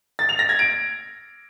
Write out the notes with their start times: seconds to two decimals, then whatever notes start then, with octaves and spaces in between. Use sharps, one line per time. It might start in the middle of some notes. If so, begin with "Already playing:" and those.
0.19 A6
0.29 F7
0.39 A#6
0.49 G#6
0.59 D7